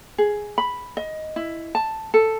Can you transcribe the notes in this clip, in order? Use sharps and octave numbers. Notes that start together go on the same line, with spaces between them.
G#4
B5
D#5
E4
A5
A4